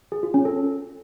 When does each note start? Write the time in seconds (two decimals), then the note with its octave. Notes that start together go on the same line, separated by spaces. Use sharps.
0.12 G#4
0.23 F4
0.34 C#4
0.45 A4